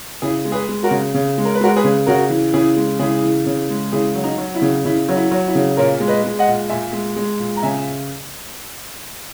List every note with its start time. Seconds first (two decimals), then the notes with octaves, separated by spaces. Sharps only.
0.22 C#3 E4 G#4
0.45 G#3
0.52 G#4 B4
0.69 G#3
0.83 F#4 A#4
0.91 C#3
1.14 C#3
1.38 G#3
1.45 A#4
1.55 B4
1.61 G#3 F#4 A#4
1.76 G#4 B4
1.84 C#3
2.06 C#3 F#4 A#4
2.30 E3
2.53 C#3 E4 G#4
2.76 G#3
2.99 C#3 E4 G#4
3.22 E3
3.46 C#3
3.70 G#3
3.92 C#3 E4 G#4
4.15 F#3
4.24 D#4
4.38 F#3
4.55 E4
4.62 C#3
4.85 C#3 E4
5.09 F#3
5.15 E4
5.31 F#3
5.47 E4
5.55 C#3
5.77 A#2 A#4 C#5
6.00 G#3
6.08 B4 D#5
6.24 G#3
6.39 D#5 F#5
6.48 A#2
6.70 A#2 E5 G#5
6.93 G#3
7.16 G#3
7.39 A#2
7.56 A#5
7.63 C#3 E5 G#5